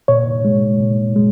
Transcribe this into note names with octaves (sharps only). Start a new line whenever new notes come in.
A#2 C#5
G#3
A#2
G#3